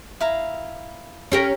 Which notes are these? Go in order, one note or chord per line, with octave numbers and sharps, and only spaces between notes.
E4 F5 A#5
C#4 G4 A#4